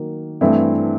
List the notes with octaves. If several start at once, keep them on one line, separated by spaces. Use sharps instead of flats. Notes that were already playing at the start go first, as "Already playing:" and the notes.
Already playing: D#3 F#3 A#3
G2 E3 A3 C4 E4